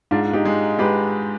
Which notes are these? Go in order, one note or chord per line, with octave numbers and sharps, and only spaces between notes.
G#2 D4 F4
F4
D#4 G4
G#3
G#3 G4 B4